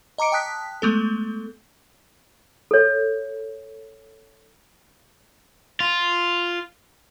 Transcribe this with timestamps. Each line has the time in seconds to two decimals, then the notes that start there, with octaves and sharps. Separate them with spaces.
0.18 D#5 A#5 D6 C#7 D7
0.32 G5 A5 D#6 F#6 B6
0.82 G#3 A3 B3 A4
2.71 A4 C#5
5.80 F4